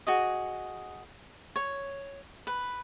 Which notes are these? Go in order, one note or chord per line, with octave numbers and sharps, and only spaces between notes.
F#4 G#4 D#5
C#5
B4